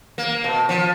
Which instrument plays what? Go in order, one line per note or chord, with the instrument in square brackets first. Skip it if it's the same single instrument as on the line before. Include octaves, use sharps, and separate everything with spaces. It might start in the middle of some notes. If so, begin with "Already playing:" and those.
[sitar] A#3
B2
F3